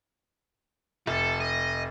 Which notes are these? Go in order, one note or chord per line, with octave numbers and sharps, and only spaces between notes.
F1 A4
D#5